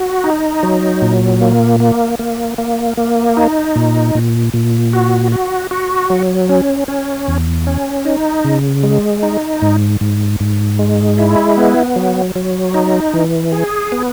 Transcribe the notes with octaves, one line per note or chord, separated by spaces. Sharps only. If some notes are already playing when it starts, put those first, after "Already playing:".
Already playing: F#4
D#4
F#3
A#2
A#3
A#3
A#3
A#3
A#3
D#4
A#2
A#2
A#2
F#4
F#4
F#4
F#3
C#4
C#4
E2
C#4
D#4
C#3
G#3
D#4
G#2
G#2
G#2
G#3
E4
B3
F#3
F#3
D#4
E3
G#4
B3